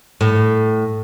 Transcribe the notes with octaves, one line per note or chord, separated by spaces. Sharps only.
A2